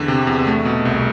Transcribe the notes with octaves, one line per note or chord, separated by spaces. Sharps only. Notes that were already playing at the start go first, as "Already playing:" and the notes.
Already playing: E2 D3
C3
E2
A3
B2
C2